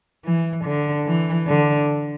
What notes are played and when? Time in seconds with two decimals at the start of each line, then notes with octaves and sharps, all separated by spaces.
0.24 E3
0.65 D3
1.06 E3
1.48 D3